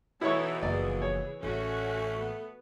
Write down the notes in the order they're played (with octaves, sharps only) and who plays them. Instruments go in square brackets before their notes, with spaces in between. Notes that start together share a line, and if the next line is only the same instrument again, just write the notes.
[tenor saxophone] B2 [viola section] E3 D#4 A4 [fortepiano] E4 C#5 C#6
[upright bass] F#1 F3 [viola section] E3 G#4 [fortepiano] D5
[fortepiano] C#5
[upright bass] A1 [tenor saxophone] A3 [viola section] C#4 F#4
[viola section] B3